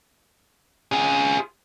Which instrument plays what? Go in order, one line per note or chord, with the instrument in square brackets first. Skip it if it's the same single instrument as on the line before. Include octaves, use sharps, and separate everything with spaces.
[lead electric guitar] F4 G#4